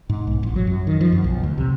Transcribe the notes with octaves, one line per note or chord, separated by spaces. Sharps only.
G#2
B1
A1
F#3
F#2
D#3
F3
F#2
B1
D2
C3